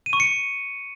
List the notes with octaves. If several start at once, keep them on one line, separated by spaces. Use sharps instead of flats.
D#7
C#6
C#7